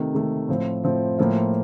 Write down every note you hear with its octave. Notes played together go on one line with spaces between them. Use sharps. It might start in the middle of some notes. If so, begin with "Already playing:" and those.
Already playing: C3 D#3 A3
C3 D#3 A3
A2 F3 C4
A2 F3 C4
A2 F3 A#3 F4